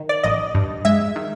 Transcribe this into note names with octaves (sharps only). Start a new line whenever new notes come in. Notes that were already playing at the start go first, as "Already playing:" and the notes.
Already playing: D#3
D5
A1 D#5
G2
G#3 E5
D#3